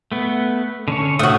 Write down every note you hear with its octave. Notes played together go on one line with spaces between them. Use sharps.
A3 B3
D3 C#4 C#5
A2 F#4 C5 D#6